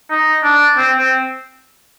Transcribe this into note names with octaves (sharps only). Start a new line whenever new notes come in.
D#4
D4
C4
C4